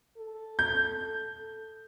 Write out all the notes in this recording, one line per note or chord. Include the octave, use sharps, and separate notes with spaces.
A4
G6